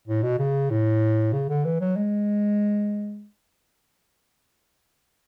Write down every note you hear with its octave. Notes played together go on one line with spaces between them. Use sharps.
A2
B2
C#3
A2
C#3
D3
E3
F#3
G#3